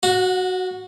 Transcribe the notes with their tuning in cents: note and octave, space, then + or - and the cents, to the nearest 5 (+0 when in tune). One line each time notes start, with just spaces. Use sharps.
F#4 +0 F#5 -30